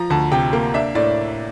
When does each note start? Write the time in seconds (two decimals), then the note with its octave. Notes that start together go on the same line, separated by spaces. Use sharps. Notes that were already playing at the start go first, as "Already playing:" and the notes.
Already playing: F3 A#5
0.10 D2 A5
0.31 C3 G5
0.53 A#3
0.74 D4 E5
0.95 A2 D5